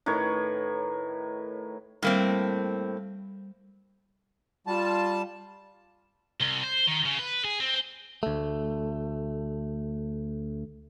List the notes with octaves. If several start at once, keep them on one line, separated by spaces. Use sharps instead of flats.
A2 D#3 B4 C#5
A2 G3 A#3 C4
G3 F4 A5
C2
C5
D#3
C#3
B4
G#4
C4
D2 A3